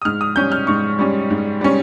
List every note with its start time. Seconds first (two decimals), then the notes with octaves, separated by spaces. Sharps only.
0.02 D#6
0.05 G#2 F6
0.21 D#6
0.36 G3 C#4 G6
0.52 F6
0.67 G#2 C#6
0.99 G3 C#4
1.30 G#2
1.61 G3 C#4